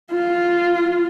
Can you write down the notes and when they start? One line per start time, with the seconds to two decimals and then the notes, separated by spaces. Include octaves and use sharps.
0.11 F4